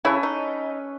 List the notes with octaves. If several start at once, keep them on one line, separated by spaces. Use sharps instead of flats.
C#3 C#4 E4 A4 B4 C#5
D#4